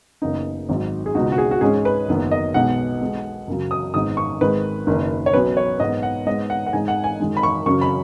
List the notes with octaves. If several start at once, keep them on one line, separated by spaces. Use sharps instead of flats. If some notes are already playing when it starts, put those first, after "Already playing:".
F#1 F#2 C#3 B3 D#4
G#1 G#2 F#3
G#4
C#2 B2 G#3 D#4 F#4
F#4
G#4
F#4
G#2 G#3 C#4 G#4
B4
F#1 F#2 D#3 B3
D#5
B1 B2 G#3 B3 D#4 F#5
B1 B2 G#3
F#2 C#3 F#3
D#6
G#1 G#2 G#3 B3 D#4 D#6
C#6
G#1 G#2 D#3 G#3 B4
F#1 F#2 D#3
C#5
B1 B2 F#3 C#4 B4
C#5
G#2 G#3 B3 D#5
F#5
G#2 G#3 B3 D#5
F#5
F#5
G#2 G#3 D#4 G#5
F#5
G#5
F#2 D#3 G#3
B5
C#6
F#2 C#3 F#3 C#4 C#6
B5